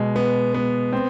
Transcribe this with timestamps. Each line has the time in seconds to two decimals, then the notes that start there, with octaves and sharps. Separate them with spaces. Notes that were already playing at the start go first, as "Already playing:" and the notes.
Already playing: B2 G#3
0.16 B3
0.54 B3
0.93 C4